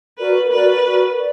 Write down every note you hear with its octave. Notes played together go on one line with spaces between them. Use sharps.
F#4 A#4 B4 D5
F#4 A#4 B4 D5
F#4 A#4 D5
D5